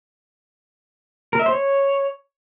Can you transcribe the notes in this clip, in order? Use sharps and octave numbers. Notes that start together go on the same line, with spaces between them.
A#4
E5
C5
C#5